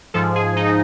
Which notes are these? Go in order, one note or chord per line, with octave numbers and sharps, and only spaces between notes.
G#2 F3 A4
G#4
D#4